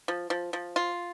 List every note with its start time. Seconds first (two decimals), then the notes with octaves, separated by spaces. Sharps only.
0.08 F3
0.30 F3
0.53 F3
0.76 F4